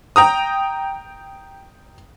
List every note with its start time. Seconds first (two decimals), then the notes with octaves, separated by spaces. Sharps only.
0.16 G5 A#5 D#6